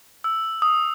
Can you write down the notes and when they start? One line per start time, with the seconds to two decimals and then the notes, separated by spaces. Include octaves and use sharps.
0.24 E6
0.62 D#6